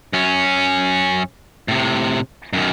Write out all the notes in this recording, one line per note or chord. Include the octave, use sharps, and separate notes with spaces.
F#2 C#4
A2 C3
F#2 D#3